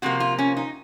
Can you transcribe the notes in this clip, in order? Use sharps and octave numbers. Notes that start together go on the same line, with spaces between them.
C3 F3 A#3 F#4
F4
C#4
D#4